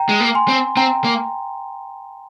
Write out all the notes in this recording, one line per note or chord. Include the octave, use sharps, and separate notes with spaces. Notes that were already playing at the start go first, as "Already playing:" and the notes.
Already playing: G5 A#5
G#3
A#3
G#5 C6
C4
C4 G5 A#5
A#3